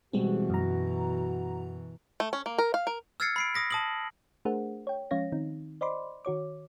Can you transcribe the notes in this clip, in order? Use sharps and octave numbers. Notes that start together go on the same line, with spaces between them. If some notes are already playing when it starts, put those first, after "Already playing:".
B2 E3 G3 G#3 C4 F#4
F#2 A#5
A3
C#4
A#3
A#4
F5
A#4
E6 F6 G#6 A6 C7 C#7
B5 C7 D7
D#6 A#6 B6
A5 D#6 F#7
A3 D4 G#4 A#4 C5 F#5
C#5 G5
F3 G#3 C#4 C#5 F5 A#6
D#3 C4 D#4
C5 D5 D#5 B5 C6 D6
D#3 F#4 C#5 D6